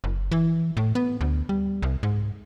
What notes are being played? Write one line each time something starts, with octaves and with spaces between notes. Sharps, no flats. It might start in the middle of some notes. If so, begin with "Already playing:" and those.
F#1
E3
A2
B3
D2
G3
C2
G#2